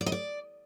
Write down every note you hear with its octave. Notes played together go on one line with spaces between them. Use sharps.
D5
D#5
D5